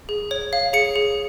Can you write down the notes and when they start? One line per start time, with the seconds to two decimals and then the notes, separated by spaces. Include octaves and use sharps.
0.09 G#4
0.31 C#5
0.53 F5
0.73 G#4 C#7
0.96 G#4